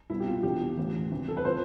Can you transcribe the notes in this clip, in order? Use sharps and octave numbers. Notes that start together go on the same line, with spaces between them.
C2 B2 E4
G4
F4
E2 D3 F3 G4
A1 A2 E3
D2 C3 E3
A4
B4
D3 F3 C5